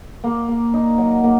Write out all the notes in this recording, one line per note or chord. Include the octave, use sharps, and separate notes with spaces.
A#3
A#3
D#4
F#3
A#3